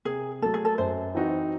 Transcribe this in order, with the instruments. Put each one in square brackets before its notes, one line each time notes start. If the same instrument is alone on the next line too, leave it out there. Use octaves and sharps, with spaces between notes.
[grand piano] C3 [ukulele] G#4
[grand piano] F#3 A3 [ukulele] A4
[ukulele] G#4
A4
[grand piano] F#2 [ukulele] C5
[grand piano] E3 C4 D#4 F#4